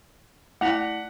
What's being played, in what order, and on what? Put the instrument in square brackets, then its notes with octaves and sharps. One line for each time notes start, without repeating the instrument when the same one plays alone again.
[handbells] A3 E4 B6 [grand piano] F#5